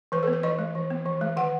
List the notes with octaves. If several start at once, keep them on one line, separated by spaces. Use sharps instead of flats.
E3 B4
A4
B3
B4
E3 D#5
G#3
E3
B3
E3
G#3
D#3 F#5